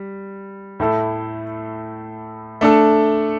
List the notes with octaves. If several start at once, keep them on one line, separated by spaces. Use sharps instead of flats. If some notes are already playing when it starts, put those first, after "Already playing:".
Already playing: G3
A2 A3 E4 A4
A3 D4 A4